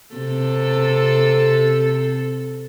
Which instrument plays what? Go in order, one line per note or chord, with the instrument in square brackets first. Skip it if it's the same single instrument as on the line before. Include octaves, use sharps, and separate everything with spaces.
[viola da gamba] C3 A4